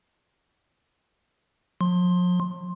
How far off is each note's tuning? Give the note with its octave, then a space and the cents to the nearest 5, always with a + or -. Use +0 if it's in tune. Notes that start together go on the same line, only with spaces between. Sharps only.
F3 +45 C6 +15